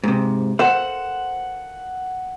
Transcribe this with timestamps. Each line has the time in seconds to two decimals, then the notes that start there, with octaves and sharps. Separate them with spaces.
0.04 G#2 C3
0.59 A4 C5 F#5